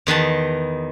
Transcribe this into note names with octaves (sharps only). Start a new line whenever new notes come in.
E2 D#3 B4 A5